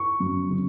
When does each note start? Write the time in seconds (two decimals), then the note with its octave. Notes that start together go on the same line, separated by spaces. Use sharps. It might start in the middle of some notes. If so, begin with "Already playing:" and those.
Already playing: C#6
0.20 F#2
0.50 C#3